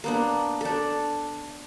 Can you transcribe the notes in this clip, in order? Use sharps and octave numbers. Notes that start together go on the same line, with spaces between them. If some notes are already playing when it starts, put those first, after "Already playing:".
A#3 B3 D4
D4 A4